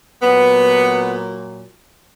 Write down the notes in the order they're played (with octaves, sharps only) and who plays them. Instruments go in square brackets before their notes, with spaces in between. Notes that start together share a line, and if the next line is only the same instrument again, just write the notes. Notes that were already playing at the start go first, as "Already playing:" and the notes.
[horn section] A#2 F#3 B3